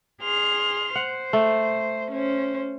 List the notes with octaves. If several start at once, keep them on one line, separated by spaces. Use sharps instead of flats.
G#4 C6 F6
C5 F#5
A3
C#4 C5